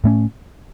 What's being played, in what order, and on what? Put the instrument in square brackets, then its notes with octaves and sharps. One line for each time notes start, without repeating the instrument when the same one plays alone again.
[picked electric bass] A2 A3 C#4